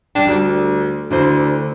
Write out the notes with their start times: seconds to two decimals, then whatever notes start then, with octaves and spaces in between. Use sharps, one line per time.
0.15 G3 D4 G5
0.27 D2 G3 A4
1.11 D2 D3 E4 C5